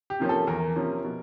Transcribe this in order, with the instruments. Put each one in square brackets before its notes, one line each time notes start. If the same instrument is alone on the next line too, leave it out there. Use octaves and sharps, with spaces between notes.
[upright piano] G4
C3 F3 A#3 C#4
A4
E2 A#4
C3 F3 A#3 C#4
B2